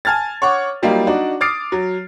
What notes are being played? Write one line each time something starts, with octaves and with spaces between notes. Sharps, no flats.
G#5 A5 F6 G#6 A6
C#5 F#5 C#6 D6
F#3 G3 A#3 D#4 F4
D4 D#4 F#4 D5
D6 D#6 F6 A6 C7 D7
F#3